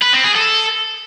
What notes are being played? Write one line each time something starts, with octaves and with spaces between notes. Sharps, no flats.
B4
C4
G#4
A4